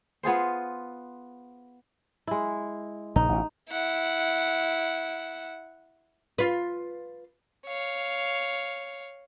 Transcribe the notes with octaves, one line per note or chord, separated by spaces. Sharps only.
B3 F4 G#4 C5
G#3 E4
A#1 C#3 D#4
A1 B2
E4 F#5
F4 B4
C#5 F5